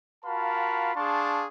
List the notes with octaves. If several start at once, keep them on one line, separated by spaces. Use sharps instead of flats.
F4 F#4 A#4 F5 A5 B5
D4 G#4 F5 A5 C6 C#6